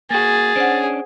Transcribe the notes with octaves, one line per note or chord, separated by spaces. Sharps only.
A#3 F#4 G#4 A6
C#4 D4 C5 F#5